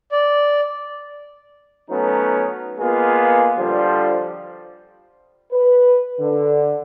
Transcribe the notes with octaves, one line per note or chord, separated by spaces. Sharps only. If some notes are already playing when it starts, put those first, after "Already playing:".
D5
F#3 A3 B3 C#4 D#4
G#3 A#3 B3 F4 G#4
D3 F3 G3 C5
B4
D3